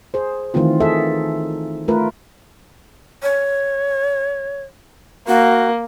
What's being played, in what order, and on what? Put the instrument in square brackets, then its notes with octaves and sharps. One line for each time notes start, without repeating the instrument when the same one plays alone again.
[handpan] G#4 C5
D#3 E3 A3 C4 F4
D#4 G#4 A4 E5
A3 F4 A#4 B4
[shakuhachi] C#5
[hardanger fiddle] A#3 [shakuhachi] F#4